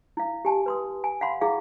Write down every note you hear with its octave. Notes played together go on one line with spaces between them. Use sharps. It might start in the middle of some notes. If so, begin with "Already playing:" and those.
E4 F5
G4 G#5 A5
B4 C6 D#6
G#5
F5 F#5 B5 C6
E4 G#4 F5 D6